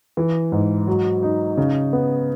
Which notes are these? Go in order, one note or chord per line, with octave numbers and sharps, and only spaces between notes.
E3
G#2
F#3
D#4
C#3
B3